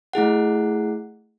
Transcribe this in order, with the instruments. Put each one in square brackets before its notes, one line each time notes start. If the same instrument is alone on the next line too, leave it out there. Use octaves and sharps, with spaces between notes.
[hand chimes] A3 E4 G#4 F#5